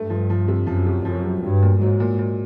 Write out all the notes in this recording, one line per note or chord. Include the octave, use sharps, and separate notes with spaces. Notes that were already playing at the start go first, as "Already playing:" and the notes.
Already playing: G2 A3
F3
F3
C3
F#2 F3
C3
F#2 F3
C3
G2 F#3
A#2
G#2 F#3
A#2
A#2